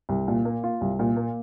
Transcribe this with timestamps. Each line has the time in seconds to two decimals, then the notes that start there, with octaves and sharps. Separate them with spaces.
0.09 C2
0.28 A#2
0.45 A#3
0.63 F4
0.81 C2
0.99 A#2
1.16 A#3